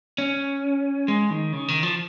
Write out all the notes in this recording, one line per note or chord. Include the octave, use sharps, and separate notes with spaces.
C#4
G#3
D#3
C#3
D#3
F3